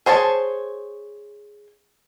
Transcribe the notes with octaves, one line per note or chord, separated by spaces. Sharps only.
G#4 C5 C#5 A5